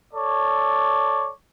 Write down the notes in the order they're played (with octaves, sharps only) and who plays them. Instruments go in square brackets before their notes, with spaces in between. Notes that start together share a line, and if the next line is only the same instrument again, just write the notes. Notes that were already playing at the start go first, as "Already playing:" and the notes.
[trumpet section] A4 C#5 D5